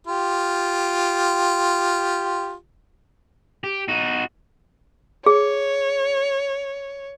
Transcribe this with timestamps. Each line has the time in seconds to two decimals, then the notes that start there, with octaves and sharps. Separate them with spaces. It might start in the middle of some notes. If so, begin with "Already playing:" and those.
0.07 F4 G4
3.64 G4
3.88 D#4 F#4
5.26 G#4 C#5